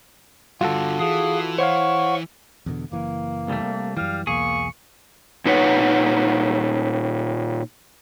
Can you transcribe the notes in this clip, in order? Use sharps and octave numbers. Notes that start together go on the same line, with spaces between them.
G2 D3 F4 F#4 A4
E3 G#4 F5 D#6
C5 C#5 F5 F#5 C#6
E2 B2 D3
F#1 E3 A#3
C2 G3 A3
F#2 E3 G3 F5
B1 E2 A#3 G#4 C#6
A#2 D#4 B4 C#5 F#5